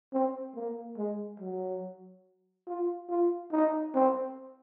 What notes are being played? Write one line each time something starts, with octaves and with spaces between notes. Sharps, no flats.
C4
A#3
G#3
F#3
F4
F4
D#4
C4